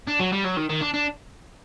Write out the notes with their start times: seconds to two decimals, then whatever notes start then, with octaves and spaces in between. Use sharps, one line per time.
0.08 D4
0.20 F#3
0.33 G3
0.45 F#3
0.57 D#3
0.69 D#3
0.82 D4
0.94 D4